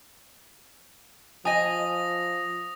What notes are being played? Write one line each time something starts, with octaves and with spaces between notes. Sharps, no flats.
F3 D#5 G#5 D#6 A#6